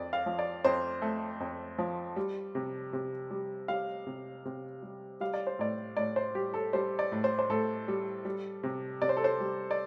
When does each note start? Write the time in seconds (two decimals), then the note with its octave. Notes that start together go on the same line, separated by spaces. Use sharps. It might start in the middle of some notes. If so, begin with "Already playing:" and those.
Already playing: F2 D5
0.13 F5
0.26 F3
0.39 D5
0.64 F2 C5
1.02 A3
1.40 F2
1.78 F3
2.16 G3
2.55 C3
2.93 C3
3.31 G3
3.68 G3 F5
4.07 C3
4.45 C3
4.83 G3
5.20 G3 F5
5.34 D5
5.47 C5
5.59 A2 D5
5.97 A2 D5
6.16 C5
6.35 G3 G4
6.54 A4
6.73 G3 C5
6.99 D5
7.12 A2
7.24 C5
7.39 C5
7.50 A2 A4
7.88 G3
8.25 G3
8.63 C3
9.02 C3 D5
9.09 C5
9.17 A4
9.24 C5
9.40 G3
9.71 D5